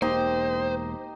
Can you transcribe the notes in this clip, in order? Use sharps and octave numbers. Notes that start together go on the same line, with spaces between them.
E1 A#3 D#4 G4 C5